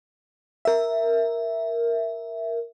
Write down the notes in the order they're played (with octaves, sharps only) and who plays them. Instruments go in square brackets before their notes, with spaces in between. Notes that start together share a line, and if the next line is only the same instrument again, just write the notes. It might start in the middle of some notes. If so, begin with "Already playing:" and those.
[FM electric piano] A#4 E5